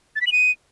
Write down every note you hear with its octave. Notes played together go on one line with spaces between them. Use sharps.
A6
B6
F#7
D#7